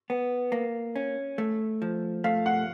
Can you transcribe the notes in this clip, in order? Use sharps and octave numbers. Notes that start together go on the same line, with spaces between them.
B3
A#3
C#4
A3
F3
A3 F5
F#5